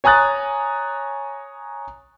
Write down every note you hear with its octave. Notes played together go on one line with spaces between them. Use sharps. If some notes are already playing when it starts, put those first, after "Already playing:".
C#5 G#5 A#5 D#6 F#6 A6